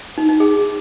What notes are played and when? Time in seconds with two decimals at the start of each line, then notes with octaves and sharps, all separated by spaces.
0.18 D#4
0.29 D#4
0.40 G#4